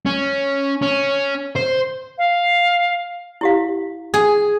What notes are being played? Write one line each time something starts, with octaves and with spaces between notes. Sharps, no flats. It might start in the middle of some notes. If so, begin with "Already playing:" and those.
C#4
C#4
C5
F5
E4 G4 F5
G#4